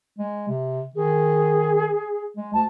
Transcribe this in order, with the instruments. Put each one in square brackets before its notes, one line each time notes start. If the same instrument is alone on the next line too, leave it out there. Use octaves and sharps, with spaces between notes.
[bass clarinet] G#3
C3
[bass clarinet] D#3 [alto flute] G#4
[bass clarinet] G#3
[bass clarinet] D2 [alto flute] A5